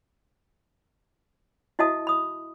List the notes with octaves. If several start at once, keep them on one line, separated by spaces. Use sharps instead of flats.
E4 F#4 D#5 E5 A5 D#6
B5 D#6